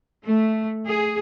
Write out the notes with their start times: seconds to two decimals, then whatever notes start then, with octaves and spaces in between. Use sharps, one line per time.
0.25 A3
0.87 G#4